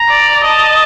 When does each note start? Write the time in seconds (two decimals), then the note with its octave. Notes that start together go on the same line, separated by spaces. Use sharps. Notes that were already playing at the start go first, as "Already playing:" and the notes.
Already playing: A#5
0.09 D5
0.44 D#5 A5